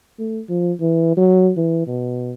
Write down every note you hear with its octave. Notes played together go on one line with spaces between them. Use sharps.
A3
F3
E3
F#3
E3
B2